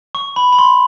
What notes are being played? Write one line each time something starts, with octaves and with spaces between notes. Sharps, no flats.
C#6
B5
B5
C6